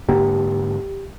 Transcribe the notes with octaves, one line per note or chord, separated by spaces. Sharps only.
G#2 D3 A#3 G4